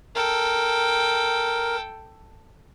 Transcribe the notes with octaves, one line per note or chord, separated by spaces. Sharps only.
A4 A#4 G5